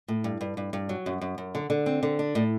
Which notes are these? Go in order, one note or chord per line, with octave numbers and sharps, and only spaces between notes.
A2
G2
G2
G2
G2
F#3
F#2
F#2
F#2
D3
D3
C4
D3
D4
A2